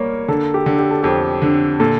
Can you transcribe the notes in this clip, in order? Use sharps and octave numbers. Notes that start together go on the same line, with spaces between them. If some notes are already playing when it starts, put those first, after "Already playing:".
Already playing: G3 A#3 A#4 C#5
D3 A4
G4
D3
G4
A4
F2 G4
D3
A#2 A4